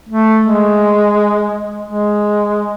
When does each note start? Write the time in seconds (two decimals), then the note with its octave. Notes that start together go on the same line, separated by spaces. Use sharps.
0.09 A3
0.44 G#3
1.85 G#3